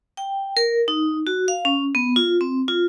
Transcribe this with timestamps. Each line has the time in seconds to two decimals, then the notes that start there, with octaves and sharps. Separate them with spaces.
0.17 G5
0.57 A#4
0.88 D#4
1.27 F#4
1.48 F5
1.65 C#4
1.95 B3
2.16 F4
2.41 C4
2.68 F4